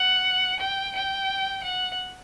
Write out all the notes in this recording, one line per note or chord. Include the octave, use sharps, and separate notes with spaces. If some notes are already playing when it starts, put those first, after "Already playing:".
Already playing: F#5
G5
G5
F#5